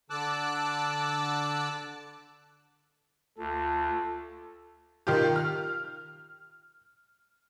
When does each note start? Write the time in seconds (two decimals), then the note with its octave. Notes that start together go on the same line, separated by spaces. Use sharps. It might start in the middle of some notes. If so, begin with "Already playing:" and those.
0.10 D3 A5 D6 E6 F#6
3.38 D2 F4 A4
5.07 D#3 F4 G4
5.36 F6